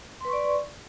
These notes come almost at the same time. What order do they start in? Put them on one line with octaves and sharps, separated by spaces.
C6 B4 C#6 D5